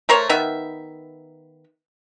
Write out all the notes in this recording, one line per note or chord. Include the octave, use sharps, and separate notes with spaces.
A3 A#4 C5 C#5
D#3 B3 E5